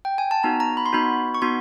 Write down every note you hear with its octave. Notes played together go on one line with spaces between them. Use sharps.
G5
G#5
A5
B3 D#4 F#4 A#5
A#5
B5
C6
B3 D#4 F#4 B5
C#6
B3 D#4 F#4 C6